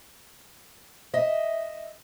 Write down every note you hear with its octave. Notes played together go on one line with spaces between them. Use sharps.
D#5 E5